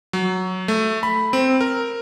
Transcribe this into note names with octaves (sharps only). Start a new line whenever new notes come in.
F#3
A3
B5
C4
A#4